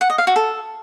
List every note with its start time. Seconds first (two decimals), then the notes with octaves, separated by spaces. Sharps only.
0.01 F#5
0.10 D#5
0.18 F5
0.27 F#4
0.36 A4